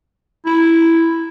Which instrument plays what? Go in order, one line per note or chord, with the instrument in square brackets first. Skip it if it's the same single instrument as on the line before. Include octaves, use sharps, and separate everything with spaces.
[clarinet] E4